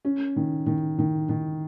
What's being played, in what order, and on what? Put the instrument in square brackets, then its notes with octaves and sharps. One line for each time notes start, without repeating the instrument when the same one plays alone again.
[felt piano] C#4
D#3
D#3
D#3
D#3